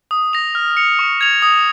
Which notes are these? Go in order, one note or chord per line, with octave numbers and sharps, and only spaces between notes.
D#6
A#6 F7
F6
C#7 F7
C#6
G#6 F7
D#6